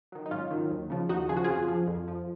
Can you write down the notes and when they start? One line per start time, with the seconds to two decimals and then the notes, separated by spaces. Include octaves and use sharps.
0.12 D#3 F#3
0.26 D#4
0.31 G#2 C#4 F4
0.50 D#3 F#3
0.70 D#2
0.90 C#3 F3
1.09 D#2 D#4 F#4
1.29 C#3 F3 G#4
1.37 F#4
1.44 F2 F4 G#4
1.68 F3
1.87 F2
2.08 F3